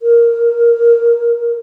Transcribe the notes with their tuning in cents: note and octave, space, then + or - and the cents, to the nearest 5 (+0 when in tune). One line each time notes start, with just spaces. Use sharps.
A#4 +0